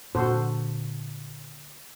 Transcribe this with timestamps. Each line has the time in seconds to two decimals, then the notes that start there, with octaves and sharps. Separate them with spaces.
0.15 A#2 D3 F#4 A4 C5